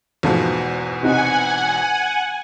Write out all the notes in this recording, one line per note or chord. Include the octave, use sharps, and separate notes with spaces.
E2 G#2 B2 F3 A3
C3 D#4 F#5 G#5